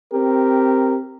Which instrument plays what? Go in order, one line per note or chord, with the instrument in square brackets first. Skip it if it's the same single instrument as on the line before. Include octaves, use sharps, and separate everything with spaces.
[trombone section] C4 G4 A#4